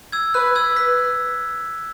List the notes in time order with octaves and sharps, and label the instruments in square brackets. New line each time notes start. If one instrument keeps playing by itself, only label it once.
[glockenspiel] E6 G#6
[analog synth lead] B4 [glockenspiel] F#6
[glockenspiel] E6 G#6
F#6 B6